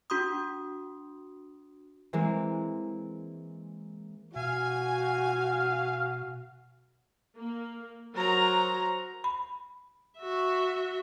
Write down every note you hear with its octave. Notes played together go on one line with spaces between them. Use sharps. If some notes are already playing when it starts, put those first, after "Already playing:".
D4 F#4 C6 D#6
E3 G#3 A#3 C4
B2 F#4 F5 G#5
A#3
F#3 A#4 C5 A#5
B5
F#4 E5